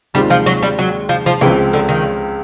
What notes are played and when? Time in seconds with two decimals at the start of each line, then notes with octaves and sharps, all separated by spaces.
0.14 D#2 D#3 G3 G#3 C4 F4
0.30 F3
0.46 F#3
0.62 G3
0.79 F#3
1.09 F3
1.26 F3
1.41 C#2 C#3 E3 F3 G#3 C4
1.73 D3
1.89 D#3